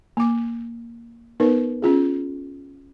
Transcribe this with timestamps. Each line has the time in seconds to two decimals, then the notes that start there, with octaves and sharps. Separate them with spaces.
0.17 A#3 D6
1.40 B3 D#4 A#4 B4
1.82 C#4 F4 G#4